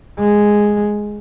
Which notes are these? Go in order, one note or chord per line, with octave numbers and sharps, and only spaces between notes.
G#3